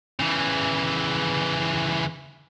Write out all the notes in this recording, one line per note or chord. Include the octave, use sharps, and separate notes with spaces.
C#3 E3